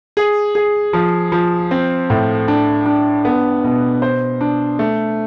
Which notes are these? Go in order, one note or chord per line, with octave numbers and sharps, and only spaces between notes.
G#4
G#4
F3
F3
C4
A2
D4
D4
B3
B2
C5
D4
A3